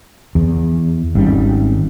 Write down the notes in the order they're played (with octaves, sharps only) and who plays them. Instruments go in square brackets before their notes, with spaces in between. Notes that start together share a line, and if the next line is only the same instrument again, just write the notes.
[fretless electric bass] E2
G#1 G3 C#4